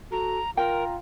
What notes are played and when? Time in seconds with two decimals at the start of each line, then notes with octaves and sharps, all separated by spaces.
0.12 F#4 A4 A#5
0.57 F4 A#4 G5 A#5